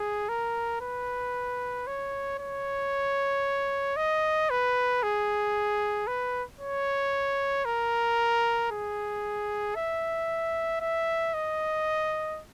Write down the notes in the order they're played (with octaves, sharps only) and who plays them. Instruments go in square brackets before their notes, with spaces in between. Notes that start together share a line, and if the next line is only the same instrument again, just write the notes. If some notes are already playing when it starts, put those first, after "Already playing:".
Already playing: [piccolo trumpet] G#4
A#4
B4
C#5
C#5
D#5
B4
G#4
B4
C#5
A#4
G#4
E5
E5
D#5